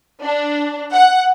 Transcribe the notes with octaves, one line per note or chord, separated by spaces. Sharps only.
D4
F#5